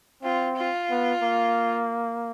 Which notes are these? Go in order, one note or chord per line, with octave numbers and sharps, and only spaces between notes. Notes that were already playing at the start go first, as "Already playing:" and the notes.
C4 F4
F4
B3
A#3